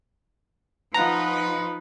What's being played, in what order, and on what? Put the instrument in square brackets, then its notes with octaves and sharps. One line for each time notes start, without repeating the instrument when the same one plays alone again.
[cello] F3 D#4 [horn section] F4 B4 [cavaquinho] F5 F#5 A5 [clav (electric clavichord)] A#5